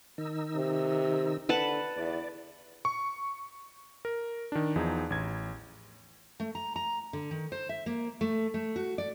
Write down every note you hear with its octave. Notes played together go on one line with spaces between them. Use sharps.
D#3 D#4 E6
C3
D3 B4 F#5 A5
E2 D5
C#6
A#4
D#3 D4
E2 F3 D#4 G#4
A1 G#6
A3
A#5
A#5
D3
D#3
C5
E5
A#3
A3
A3
F#4
D5